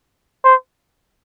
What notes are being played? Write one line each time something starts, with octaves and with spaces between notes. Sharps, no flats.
C5